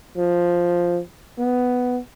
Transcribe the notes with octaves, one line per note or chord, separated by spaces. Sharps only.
F3
B3